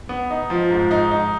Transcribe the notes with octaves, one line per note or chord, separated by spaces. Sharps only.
B3
D#4
F3
G#2
D#4
D#4